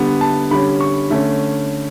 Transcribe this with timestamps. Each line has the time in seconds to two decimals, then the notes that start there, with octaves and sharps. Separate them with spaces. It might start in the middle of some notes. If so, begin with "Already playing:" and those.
Already playing: D3 G3 B3
0.21 A5
0.51 D3 G3 C#4 B5
0.81 C#6
1.10 D3 A3 C#4